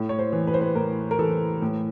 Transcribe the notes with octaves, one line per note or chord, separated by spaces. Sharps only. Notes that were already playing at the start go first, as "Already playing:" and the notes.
Already playing: A2
C#5
C5
E3
B4
C5
B4
A2 A#4
A#4
E3 A4
A2